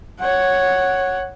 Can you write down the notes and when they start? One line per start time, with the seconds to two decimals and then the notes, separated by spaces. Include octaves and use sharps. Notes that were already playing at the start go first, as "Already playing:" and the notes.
0.20 C#5 F#5